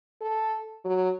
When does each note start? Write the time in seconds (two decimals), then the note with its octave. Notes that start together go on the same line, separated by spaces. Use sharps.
0.21 A4
0.84 F#3